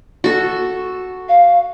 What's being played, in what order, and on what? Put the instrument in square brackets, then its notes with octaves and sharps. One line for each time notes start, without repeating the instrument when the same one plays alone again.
[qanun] F#4 A4
[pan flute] F5